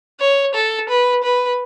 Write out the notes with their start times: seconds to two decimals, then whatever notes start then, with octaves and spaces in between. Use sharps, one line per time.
0.21 C#5
0.55 A4
0.89 B4
1.24 B4